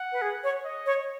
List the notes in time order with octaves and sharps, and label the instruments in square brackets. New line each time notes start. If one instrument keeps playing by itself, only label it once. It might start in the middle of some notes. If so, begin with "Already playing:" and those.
Already playing: [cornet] F#5
[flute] B4
G#4
C#5
[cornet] D#5
[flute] C#5